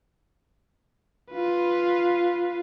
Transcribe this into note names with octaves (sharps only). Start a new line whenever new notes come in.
F4 B4